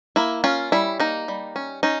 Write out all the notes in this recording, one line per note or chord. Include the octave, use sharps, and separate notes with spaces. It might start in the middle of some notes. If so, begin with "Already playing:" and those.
A#3 E4
C#4 F4
G3 E4
A#3 D#4
G3
C#4
C#4 D#4